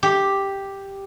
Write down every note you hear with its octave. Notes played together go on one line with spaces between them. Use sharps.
G4